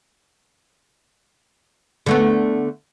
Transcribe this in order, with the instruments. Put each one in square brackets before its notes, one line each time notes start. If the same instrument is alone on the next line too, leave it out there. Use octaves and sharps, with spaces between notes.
[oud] D3 A3 B3